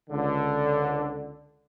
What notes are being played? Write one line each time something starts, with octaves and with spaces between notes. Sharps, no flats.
C#2 D3